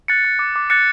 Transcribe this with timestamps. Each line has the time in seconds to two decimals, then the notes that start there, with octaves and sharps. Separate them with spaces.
0.08 F#6 A6 C#7
0.25 F#6
0.39 D6
0.56 D6
0.70 F#6 A6 C#7